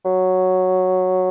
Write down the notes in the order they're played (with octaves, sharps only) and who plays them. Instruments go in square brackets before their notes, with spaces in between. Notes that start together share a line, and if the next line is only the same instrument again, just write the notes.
[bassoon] F#3